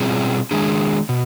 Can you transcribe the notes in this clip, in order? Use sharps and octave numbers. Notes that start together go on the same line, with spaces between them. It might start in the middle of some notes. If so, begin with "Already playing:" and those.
Already playing: B2 G3 C4 F4 G#4
D#3 G#3 D4 G#4
B2